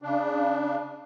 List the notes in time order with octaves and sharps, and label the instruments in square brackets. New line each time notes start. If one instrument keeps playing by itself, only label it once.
[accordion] C#3 D4